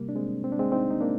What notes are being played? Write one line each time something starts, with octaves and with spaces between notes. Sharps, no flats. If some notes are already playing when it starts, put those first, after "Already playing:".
Already playing: C3 G3 A#3
D4
G#3 C4
C4
D4
G#3 C4
C4 D#4
D#4
A#3 D4